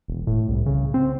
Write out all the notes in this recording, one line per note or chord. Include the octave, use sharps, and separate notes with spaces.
E1
A2
C2
C#3
C4